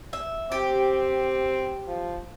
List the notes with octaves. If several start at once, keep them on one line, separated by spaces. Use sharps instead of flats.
E5
C4 G4
F3